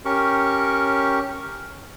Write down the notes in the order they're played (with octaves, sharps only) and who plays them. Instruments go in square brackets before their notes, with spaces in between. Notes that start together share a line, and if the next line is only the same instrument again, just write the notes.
[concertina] C#4 G4 A#4 C#6